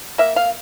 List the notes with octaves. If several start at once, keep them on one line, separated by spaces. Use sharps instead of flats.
A#3 E5
F5